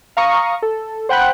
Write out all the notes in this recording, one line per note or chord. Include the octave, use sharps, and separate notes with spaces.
F5 A#5 C#6 D#6
A4
C5 F#5 G5 B5 F#6